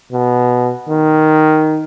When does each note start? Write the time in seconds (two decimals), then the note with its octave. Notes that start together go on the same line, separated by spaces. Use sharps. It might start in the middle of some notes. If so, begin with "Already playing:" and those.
0.12 B2
0.89 D#3